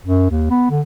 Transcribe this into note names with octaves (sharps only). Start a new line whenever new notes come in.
F#2
D#2
B3
D3